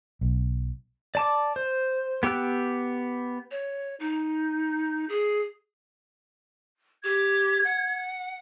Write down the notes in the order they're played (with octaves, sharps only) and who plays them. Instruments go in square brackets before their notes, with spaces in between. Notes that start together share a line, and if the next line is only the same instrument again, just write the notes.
[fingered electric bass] B1
[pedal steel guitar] D5 A5 D6
C5
B3 G4 G5 E6 F#6
[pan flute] C#5
D#4
G#4
[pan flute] G4 [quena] G#6
[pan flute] F#5